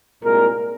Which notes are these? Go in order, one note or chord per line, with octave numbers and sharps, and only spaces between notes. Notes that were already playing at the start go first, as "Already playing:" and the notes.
C2 A#2 G#3 A#4